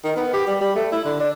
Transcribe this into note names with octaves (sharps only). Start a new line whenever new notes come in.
D#3
B3
G4
G3
G3
A3
E4
D3
D4